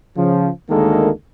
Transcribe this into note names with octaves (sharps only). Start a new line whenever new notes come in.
C#3 F3
D2 D#3 G#3 A#3 A4